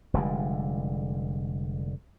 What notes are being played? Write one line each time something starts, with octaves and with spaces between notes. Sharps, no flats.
F1 D3 G3 G#3